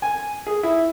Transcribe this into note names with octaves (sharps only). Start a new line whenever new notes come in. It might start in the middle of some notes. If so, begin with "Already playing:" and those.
G#5
G#4
E4